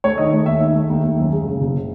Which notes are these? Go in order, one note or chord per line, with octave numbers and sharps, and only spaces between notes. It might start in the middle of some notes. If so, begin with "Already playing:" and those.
A3 C#5
D#3 D#5
A3
D#2 E5
D#3 E5
A3
D#2
D#2
F#2
G#3
C#3
F#1